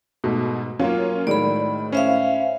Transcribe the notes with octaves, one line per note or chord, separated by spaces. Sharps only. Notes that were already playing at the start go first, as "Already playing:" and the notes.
G#2 B2 A3
F#3 A#3 C#4 F4
A2 D#3 G#3 D5 B5
C#4 C5 E5 F5